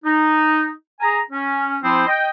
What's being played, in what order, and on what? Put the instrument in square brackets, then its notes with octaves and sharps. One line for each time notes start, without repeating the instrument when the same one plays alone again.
[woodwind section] D#4
G#4 G#5 A#5
C#4
F3 C4 E4 C5
D#5 G5